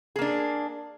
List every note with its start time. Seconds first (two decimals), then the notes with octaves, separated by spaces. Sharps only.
0.16 G#4
0.19 A#3
0.22 D4